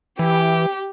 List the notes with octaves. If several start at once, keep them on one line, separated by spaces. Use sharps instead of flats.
E3 G4